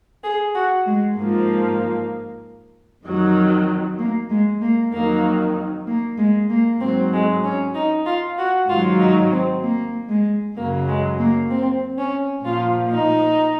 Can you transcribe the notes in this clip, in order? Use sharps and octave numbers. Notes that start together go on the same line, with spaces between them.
G#4
F#4
G#3
G#2 F3 A#3
F2 D#3 F#3
A#3
G#3
A#3
F2 D#3 F#3 A#3
A#3
G#3
A#3
G#2 F#3 C4
G#3
C#4
D#4
F4
F#4
G#2 D#3 F#3 F4
D#4
C4
A#3
G#3
F#2 C#3 F#3 A#3
G#3
A#3
C4
C#4
A#2 F3 F4
D#4